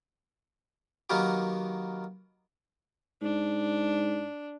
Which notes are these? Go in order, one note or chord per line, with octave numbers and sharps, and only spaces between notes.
D#3 F#3 A#3 B3 G4
G#2 D4